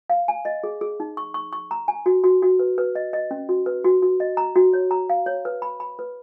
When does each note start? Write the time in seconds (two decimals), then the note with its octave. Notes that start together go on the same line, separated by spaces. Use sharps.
0.10 F5
0.28 G#5
0.45 D#5
0.64 G#4
0.81 G#4
1.00 D#4
1.17 C#6
1.34 C#6
1.53 C#6
1.71 A#5
1.88 G#5
2.06 F#4
2.24 F#4
2.42 F#4
2.59 B4
2.78 B4
2.95 D#5
3.13 D#5
3.31 C#4
3.49 F#4
3.66 B4
3.84 F#4
4.02 F#4
4.20 D#5
4.37 A#5
4.55 F#4
4.73 C#5
4.91 A#5
5.10 F5
5.26 C#5
5.45 B4
5.62 B5
5.80 B5
5.99 B4